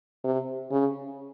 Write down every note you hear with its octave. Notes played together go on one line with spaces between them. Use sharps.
C3
C#3